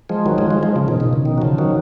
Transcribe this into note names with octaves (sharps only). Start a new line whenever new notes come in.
F3 G#3
D#3 F#3
F3 G#3
F3 G#3
F3 G#3
C#3 F3
B2 D#3
B2 D#3
C#3
B2 D#3
F#3
C#3 F3
D#3 F#3